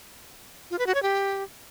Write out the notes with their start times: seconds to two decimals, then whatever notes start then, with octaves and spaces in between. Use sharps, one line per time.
0.71 F4
0.79 B4
0.87 F#4
0.95 C#5
1.03 G4